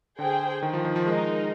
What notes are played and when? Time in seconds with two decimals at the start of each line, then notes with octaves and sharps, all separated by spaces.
0.19 D3 G#4 C5 G5
0.63 D#3
0.73 F3
0.85 D#3
0.96 F3
1.07 G#3 D#4 A#4 D#5